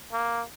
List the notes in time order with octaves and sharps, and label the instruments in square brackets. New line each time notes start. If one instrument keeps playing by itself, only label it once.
[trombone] A#3